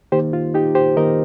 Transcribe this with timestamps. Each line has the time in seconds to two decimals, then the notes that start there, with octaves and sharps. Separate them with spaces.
0.12 D#3 A#3 D#4 G4 C5
0.33 F4
0.54 D#4 G4
0.75 G4 C5
0.97 D#3 A#3 D#4 A#4 D#5